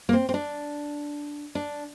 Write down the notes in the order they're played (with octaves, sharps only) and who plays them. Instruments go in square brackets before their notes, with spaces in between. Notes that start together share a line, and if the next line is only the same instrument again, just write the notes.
[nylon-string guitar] A#3
C4
C4
D4
D4